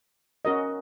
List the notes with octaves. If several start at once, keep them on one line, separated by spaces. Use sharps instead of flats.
C#4 F#4 A#4 D#5